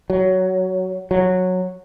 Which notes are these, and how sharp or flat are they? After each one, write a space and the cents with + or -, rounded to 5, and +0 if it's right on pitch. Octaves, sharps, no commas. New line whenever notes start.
F#3 +10
F#3 -10